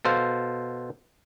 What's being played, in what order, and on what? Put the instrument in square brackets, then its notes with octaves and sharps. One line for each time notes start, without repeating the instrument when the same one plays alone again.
[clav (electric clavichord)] B2 A4 C5 F5